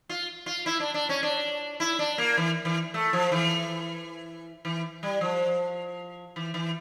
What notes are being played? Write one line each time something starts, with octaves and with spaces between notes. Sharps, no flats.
F4
F4
E4
D4
D4
C#4
D4
E4
D4
A#3
E3
E3
A3
F3
E3
E3
G3
F3
E3
E3